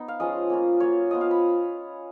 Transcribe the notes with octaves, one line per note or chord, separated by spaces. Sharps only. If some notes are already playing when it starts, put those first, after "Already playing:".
Already playing: B3 D#4
F5
F3 G#3 C#4 F4 D#5
A#3 C#4 F4
F#3 A#3 F4 C#5
F3 B3 F4 D#5
F5
B5